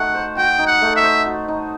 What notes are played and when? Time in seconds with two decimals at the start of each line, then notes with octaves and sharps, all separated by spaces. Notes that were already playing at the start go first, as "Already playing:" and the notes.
Already playing: A3 D#4 F#4 F#5
0.15 C5
0.37 F#4 G5
0.59 D#4
0.66 F#5
0.82 A3
0.96 E5
1.03 C5
1.26 F#4
1.48 D#4